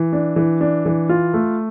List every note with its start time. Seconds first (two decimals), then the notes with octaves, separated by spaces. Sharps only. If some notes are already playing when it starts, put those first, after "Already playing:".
Already playing: E3
0.13 D4
0.36 E3
0.61 D4
0.85 E3
1.09 F4
1.34 A3